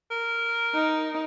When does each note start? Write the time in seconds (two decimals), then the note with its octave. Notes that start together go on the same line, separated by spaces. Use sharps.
0.11 A#4
0.74 D#4